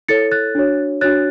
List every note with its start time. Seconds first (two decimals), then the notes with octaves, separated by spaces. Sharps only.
0.08 E4 A4 C#5 A6 C#7
0.31 F#6 A6
0.55 D4 F#4 C#5
1.01 D4 F#4 C#5 F#6 A6